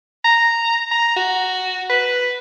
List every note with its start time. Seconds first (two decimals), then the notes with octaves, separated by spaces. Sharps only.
0.24 A#5
0.91 A#5
1.16 F#4
1.90 B4